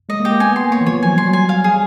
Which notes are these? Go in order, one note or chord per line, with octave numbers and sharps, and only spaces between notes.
G#3 D#5
A#3
G4
A#3
B3 G#5
C6
A#3 C#5
E3
F3 C#5
F#3 G#5
G3 C6
F#3
G#5
F5
G3 G#4